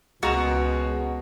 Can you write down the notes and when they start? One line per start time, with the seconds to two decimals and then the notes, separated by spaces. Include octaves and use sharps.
0.23 C#2 B2 G#3 F#4 A#5 E7